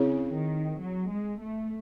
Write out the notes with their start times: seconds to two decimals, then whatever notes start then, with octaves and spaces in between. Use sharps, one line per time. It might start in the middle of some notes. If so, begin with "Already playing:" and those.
Already playing: C#3 C4 E4 G#4 C#5
0.33 D#3
0.80 F#3
1.09 G#3
1.40 A3